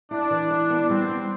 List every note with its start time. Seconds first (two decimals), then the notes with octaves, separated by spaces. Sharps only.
0.11 D4 E4
0.31 E3
0.50 E4
0.70 B3
0.89 G3 C4
1.09 D4